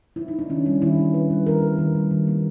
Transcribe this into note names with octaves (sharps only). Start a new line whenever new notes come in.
E4
D#4
D4
D#3 C#4
G3 D4
D#3 E4
A#3
D#3 B4
G3
D#3 A#4
A#3
D#3
G3
D#3
A#3